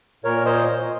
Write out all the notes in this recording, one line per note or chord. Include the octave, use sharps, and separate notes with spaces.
A#2 A#4 C#5
C5 D#5